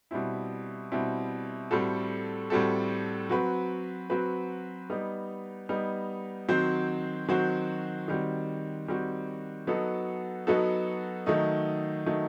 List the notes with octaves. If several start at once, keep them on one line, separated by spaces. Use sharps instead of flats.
B2 G3 C4 E4
B2 G3 C4 E4
A2 G3 C4 F#4 A4
A2 G3 C4 F#4 A4
F#3 C4 F#4 B4
F#3 C4 F#4 B4
G3 B3 D#4
G3 B3 D#4
D#3 F#3 C4 F#4 C5
D#3 F#3 C4 F#4 C5
D#3 G3 C4 F#4
D#3 G3 C4 F#4
F#3 B3 D#4 F#4 A4
F#3 B3 D#4 F#4 A4
D#3 F#3 A3 D#4
D#3 F#3 A3 D#4